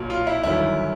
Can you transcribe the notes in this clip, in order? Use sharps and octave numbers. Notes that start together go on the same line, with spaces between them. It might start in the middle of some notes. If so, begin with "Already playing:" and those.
Already playing: B1 A#2 F#3
F4
E4
G1 F#2 D#3 F#3 E4